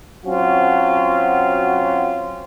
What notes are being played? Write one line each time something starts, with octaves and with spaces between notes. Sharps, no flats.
F#3 C4 C#4 F4 F#4